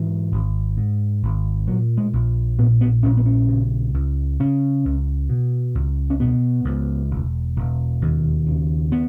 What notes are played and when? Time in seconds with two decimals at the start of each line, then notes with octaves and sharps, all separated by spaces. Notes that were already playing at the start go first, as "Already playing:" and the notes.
Already playing: G#2 E3
0.32 G#1
0.77 G#2
1.23 G#1
1.67 A#2 F#3
1.98 G#3
2.13 A#1
2.58 A#2 B3
2.81 B3
3.03 A#1 C#4
3.17 B3
3.26 C#4
3.48 C#3
3.94 C#2
4.40 C#3 C#4
4.85 C#2
5.29 B2
5.75 C#2
6.10 C#4
6.20 B2 B3
6.65 C#2
7.11 E1
7.56 E1
8.02 D#2
8.47 C#3
8.92 B3